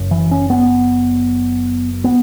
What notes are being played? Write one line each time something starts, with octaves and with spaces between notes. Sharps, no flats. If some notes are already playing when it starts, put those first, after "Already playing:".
Already playing: F#1 F#2 C#3
E3
C#4
B3
B3